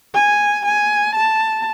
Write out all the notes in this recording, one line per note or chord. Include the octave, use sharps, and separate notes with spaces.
G#5
G#5
A5